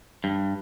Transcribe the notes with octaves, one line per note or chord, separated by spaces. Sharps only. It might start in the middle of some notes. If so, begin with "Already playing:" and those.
G2